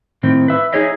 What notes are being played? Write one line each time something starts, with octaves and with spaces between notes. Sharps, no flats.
A2 D#3 C4
B4 E5
D#4 E4 G#4 C#5 D#5 E5